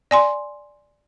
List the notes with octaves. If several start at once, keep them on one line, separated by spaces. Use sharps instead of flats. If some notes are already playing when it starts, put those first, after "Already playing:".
D5 G#5 C6